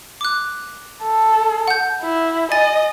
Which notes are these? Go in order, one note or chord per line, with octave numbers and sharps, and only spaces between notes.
D6 F#6
A4
F#5 G6
E4
D#5 G#5 A6